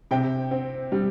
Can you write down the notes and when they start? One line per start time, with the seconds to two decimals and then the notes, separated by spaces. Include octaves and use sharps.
0.11 C3 G5
0.51 C4
0.92 G3